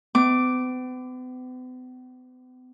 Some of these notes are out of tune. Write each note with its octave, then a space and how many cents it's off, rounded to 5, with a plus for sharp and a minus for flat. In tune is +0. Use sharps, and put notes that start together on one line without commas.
B3 +45 D6 +0